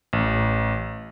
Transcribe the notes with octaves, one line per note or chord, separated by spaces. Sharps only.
A1